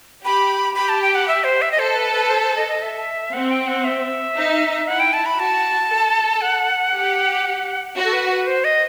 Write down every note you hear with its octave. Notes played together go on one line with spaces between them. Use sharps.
G4 B5
G4 B5
A5
G5
F#5
E5
C5
E5
D#5
A4 C5
B4
B4
C5
C5
D#5
D#5
E5
C4 F#5
G5
F#5
E5
D#4
E4 F#5
G5
A5
B5
F#4 A5
A4
F#5
G4
F#4
A4
B4
B4
C5
D#5